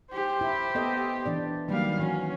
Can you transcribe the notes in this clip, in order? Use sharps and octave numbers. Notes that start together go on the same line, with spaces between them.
G4 C5
E4
B3 A4 D#5
E3 D4 D5
D#3 F#3 G3 A#3 F5
E3 C#4 F#4